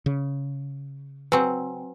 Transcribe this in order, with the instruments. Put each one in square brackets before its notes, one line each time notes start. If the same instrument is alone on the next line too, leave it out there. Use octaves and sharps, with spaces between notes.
[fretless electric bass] C#3
[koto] F#3 C4 [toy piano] B4 G#5